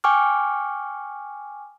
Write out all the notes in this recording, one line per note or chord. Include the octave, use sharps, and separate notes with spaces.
G5 G#5 C#6 D6 F6